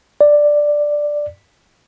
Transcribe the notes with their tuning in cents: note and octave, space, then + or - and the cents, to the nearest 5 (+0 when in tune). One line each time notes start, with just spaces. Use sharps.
D5 +5